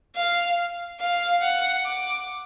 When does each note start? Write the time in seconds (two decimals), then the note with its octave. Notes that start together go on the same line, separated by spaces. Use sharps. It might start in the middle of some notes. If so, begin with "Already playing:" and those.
0.16 F5
1.00 F5
1.42 F#5
1.85 D6